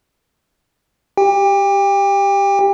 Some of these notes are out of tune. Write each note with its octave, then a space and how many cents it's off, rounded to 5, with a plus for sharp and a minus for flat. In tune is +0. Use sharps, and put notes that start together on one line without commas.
G4 +0 G5 +35